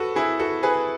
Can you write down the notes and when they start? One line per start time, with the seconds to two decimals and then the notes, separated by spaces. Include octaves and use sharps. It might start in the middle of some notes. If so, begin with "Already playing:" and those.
Already playing: F#4 A4 B4
0.16 E4 G#4
0.40 F#4 A4
0.63 G#4 B4